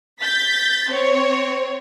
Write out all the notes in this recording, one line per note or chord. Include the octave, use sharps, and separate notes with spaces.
G6 A6 B6
C4 C#5